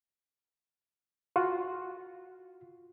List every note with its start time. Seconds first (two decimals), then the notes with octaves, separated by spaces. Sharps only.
1.36 F4 F#4